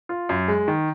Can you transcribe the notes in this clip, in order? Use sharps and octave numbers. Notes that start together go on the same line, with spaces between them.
F4
F#2
G#3
D#3